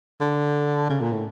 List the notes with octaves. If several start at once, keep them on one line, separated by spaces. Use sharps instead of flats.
D3
C#3
A#2
A2